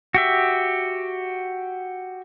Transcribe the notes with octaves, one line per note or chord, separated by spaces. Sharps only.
F#4 G4 E5